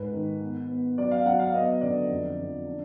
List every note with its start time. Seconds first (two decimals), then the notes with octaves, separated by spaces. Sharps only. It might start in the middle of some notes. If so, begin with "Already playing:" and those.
Already playing: G#2 B4
0.13 D#3
0.41 B3
0.69 B3
0.98 F#3 D5
1.11 F5
1.26 F#3 F#5
1.39 F5
1.53 B3 D#5
1.81 D3 D5
2.10 F2
2.38 F2
2.66 D4